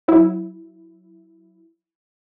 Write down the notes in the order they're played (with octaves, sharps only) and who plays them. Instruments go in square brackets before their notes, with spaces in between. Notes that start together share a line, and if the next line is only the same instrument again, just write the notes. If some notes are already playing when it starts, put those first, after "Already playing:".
[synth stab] F#3 E4